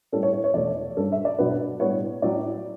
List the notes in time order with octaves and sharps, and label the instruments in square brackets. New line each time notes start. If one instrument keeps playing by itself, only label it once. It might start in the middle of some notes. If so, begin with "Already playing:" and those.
[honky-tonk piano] A2 G3 C#4 A4
C#5
C#5
C#5
E2 B2 A3 D5
G2 F#3 C#4 A4
E5
D5
B2 F#3 B3 D4 B4
A2 G3 B3 D4 C#5
A2 F#3 C#4 D5